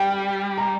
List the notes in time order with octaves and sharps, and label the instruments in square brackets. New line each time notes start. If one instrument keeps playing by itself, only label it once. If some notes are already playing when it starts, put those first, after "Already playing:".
Already playing: [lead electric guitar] G3 [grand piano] G5
[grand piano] A#5